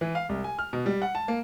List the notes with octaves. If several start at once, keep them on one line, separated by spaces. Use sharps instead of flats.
E3
F5
C2
G#5
F6
B2
G3
F#5
A5
A#3